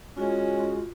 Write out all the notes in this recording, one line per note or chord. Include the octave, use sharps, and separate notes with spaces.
G#3 C#4 F4 F#4